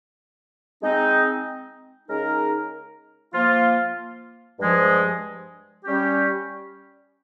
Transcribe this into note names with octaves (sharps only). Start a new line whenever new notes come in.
G#3 C4 D#4
C#3 G#3 D#4 A#4
F3 A#3 F4
G2 F3 G#3
G3 C#4 G4